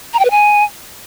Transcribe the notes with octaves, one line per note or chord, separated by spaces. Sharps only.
A#5
G5
B4
G#5